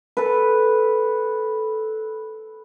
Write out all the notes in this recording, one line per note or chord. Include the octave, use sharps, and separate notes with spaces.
A4 B4